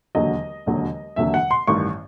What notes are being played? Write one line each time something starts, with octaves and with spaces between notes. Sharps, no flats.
E1 D#2 D3 F#3 D#5
E1 D#2 D3 F#3
E1 D#2 D3 F#3 E5
F#5
C6
A1 G2 D#3 C#6